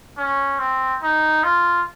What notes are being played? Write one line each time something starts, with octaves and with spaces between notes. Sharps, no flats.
C#4
C4
D#4
F4